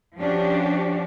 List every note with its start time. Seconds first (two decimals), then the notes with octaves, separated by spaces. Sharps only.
0.19 F3 C#4 D4 F#4 G4